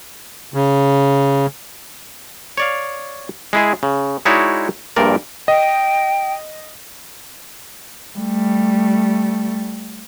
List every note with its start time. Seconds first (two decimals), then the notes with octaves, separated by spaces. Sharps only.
0.54 C#3
2.57 C#5 D5 F5
3.53 G#3 E4 G#4
3.83 C#3
4.25 G#3 D#4 E4 F#4 C#5 D5
4.96 A#1 G2 A#2 A#4 D5
5.48 D#5 G5
8.18 G3 A3